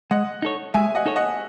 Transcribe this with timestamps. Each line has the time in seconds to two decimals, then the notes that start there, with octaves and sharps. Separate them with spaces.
0.11 G#3 D#5 F#5
0.42 D#4 A4 C#5
0.74 G#3 E5 G#5
0.95 D#5 F#5
1.06 D#4 A4 C#5
1.16 D#5 F#5